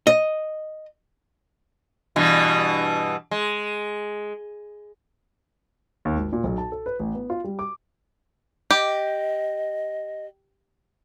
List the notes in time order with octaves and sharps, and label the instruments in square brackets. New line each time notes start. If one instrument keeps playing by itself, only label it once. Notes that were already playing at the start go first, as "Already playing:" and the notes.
[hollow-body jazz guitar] D#5
[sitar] G2 B2 E3
G#3
[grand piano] D#2
G#1
A#2
B1
A5
A4
B4
A1
B3
F4
G3
D6
[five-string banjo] G4 [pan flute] D#5